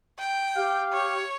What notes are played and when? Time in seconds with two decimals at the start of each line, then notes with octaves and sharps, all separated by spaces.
0.19 G5
0.56 G4 F5
0.93 C#5